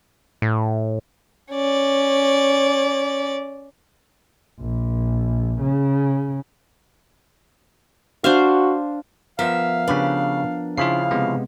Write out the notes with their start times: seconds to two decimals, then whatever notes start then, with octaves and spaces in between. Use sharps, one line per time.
0.42 A2
1.52 C#4 D5
4.60 A#1
5.61 C#3
8.24 D4 F#4 C5 F5
9.39 F3 B3 A#4 E5 F5
9.88 C#3 D4 G4 B4
10.78 C#3 F3 E4 F4 F5 B5 C7
11.11 C3 G#3 B3